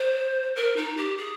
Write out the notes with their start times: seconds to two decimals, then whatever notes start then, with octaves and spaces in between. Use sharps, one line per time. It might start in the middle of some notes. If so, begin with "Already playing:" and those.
Already playing: C5
0.56 A#4
0.76 D#4
0.97 G4
1.17 G#4